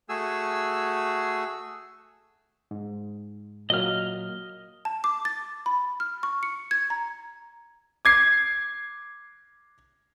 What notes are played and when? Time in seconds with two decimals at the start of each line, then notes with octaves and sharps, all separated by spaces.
0.09 A3 F#4 G#4 G#5 E6
2.71 G#2
3.70 A#2 F#3 A#3 D#5 F6
4.85 A5
5.04 D6
5.25 A6
5.66 B5
6.00 F6
6.23 C#6
6.43 C#7
6.71 G#6
6.90 A#5
8.05 D6 G#6 C7